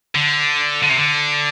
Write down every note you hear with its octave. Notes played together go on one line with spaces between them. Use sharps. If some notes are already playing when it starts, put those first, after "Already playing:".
D3
D3
C3
D3